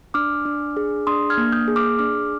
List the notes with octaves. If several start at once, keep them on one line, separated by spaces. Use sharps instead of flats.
D4 D6 F6
D4
G#4
D4 C6 D#6
F6 G#6
A#3
D#6 G6
G#4
D6 F6
D4 D6 F6